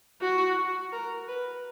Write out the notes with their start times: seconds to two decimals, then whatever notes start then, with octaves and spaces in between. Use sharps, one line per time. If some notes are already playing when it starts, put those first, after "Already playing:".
0.21 F#4
0.92 A#4
1.28 B4